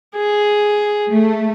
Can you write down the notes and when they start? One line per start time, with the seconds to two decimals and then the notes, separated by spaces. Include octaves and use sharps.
0.16 G#4
1.09 A3